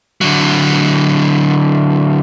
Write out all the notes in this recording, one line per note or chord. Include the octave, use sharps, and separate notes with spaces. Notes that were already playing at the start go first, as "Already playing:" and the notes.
D3 F#3